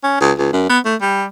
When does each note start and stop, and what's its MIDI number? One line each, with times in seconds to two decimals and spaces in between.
0.03 0.20 61
0.21 0.32 37
0.38 0.50 37
0.53 0.67 42
0.69 0.79 59
0.85 0.95 57
1.02 1.25 55